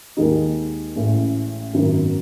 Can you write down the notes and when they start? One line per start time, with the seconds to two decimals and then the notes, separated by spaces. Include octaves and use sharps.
0.17 D#2 D#3 G#3 D#4
0.95 A1 A2 G#3 C#4
1.73 G#1 F#2 D#3 F#3 B3